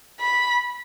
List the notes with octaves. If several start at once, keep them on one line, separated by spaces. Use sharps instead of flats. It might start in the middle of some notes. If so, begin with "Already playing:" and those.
B5